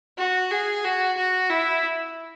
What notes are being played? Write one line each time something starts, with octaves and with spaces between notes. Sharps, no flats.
F#4
G#4
F#4
F#4
E4